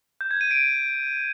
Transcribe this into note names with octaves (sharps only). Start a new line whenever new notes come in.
G6
G#6
D#7
D7